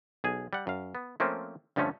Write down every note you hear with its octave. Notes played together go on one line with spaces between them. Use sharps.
B1 G#4 G#5
G3 F#5
F#2 F5
B3
F3 A3 A#3 C4 C#4
G2 D3 F3 A3 C#4